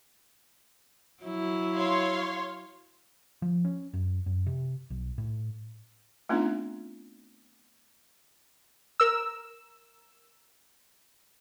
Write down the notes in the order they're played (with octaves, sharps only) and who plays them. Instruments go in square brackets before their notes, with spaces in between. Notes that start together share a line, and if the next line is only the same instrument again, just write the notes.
[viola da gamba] F#3 E4
[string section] C#5 F5 C6
[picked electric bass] F3
C#4
F#2
F#2
C3
B1
A2
[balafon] A3 B3 C4 D4 D#4 F4
[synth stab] A#4 E6